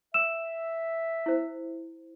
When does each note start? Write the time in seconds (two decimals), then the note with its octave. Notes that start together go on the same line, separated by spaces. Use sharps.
0.14 E5 E6 E7
1.26 E4 C5